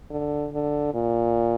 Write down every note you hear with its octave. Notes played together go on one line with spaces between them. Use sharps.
D3
D3
A#2